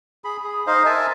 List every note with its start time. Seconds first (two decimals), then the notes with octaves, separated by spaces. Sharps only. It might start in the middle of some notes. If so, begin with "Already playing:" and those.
0.24 G#4 B5
0.44 G#4
0.67 D#4 C5 D#5 F5
0.86 A#4 E5 G#5 A5